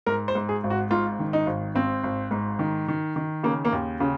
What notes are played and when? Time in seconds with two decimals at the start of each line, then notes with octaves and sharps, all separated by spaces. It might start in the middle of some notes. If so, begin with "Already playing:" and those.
0.06 G#2 A#4
0.28 C5
0.35 G#2
0.49 G#4
0.64 G#1
0.70 F#4
0.91 G#2 F4
1.19 D#3
1.33 D#4
1.47 G#1
1.75 G#1 C4
2.04 G#1
2.31 G#2
2.59 D#3
2.88 D#3
3.16 D#3
3.43 C#3 A#3
3.65 A#3
3.73 D#2
4.00 C#3